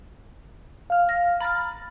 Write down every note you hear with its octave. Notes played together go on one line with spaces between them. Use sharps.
F5 F6
A#6
A#5 B5 F6 A6